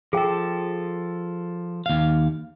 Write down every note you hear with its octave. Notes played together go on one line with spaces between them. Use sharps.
F3 G#4 A4 G5
D#2 F5